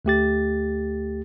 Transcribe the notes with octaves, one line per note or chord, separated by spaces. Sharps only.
D2 A3 G4 A6